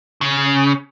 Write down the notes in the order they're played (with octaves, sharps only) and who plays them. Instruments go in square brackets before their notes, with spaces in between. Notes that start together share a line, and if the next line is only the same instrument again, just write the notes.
[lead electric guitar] C#3